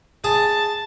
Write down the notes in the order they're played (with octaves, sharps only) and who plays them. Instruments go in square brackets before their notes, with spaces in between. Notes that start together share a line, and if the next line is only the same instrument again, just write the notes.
[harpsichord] G#4 [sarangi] A5